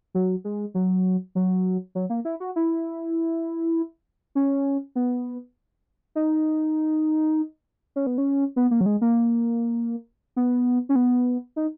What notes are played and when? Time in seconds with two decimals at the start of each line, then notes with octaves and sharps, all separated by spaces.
0.14 F#3
0.44 G#3
0.74 F#3
1.35 F#3
1.95 F#3
2.10 A#3
2.25 E4
2.40 F#4
2.56 E4
4.35 C#4
4.96 B3
6.15 D#4
7.96 C#4
8.07 B3
8.18 C#4
8.56 B3
8.71 A#3
8.81 F#3
8.86 G#3
9.01 A#3
10.36 B3
10.89 C#4
10.95 B3
11.56 D#4